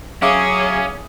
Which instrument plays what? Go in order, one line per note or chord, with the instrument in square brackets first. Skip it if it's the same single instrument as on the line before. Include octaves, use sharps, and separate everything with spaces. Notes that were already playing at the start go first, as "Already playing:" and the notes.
[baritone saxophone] F#3 [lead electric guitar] C#4 [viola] G#4 [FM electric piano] E5 F5 D6